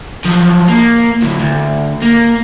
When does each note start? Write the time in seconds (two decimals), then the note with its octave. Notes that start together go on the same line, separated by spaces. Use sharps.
0.25 F3 F#3
0.68 A#3
1.22 D2 A2
1.41 D2
2.02 A#3